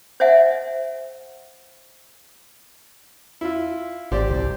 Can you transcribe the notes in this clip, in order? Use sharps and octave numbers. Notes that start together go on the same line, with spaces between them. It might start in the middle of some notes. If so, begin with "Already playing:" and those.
C5 D#5 E5 F#5 G#5
E4 F4
G#1 G4 C5 D5
C2